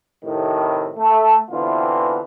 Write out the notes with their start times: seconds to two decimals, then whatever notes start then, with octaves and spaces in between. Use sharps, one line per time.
0.24 A2 C3 D#3
0.97 A3
1.51 B2 D3 E3 C4 E4 F4